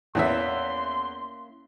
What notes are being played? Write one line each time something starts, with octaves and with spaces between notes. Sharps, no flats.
E2 E3 A#3 C#4 E4 E5 C6